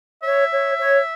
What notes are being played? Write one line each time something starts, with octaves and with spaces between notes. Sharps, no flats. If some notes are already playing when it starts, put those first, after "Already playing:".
C#5 E5
C#5
C#5